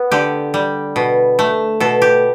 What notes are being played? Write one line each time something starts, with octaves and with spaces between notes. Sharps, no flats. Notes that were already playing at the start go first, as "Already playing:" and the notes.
Already playing: B3
D3 G4
G3
B2
A3
B2 A4
G4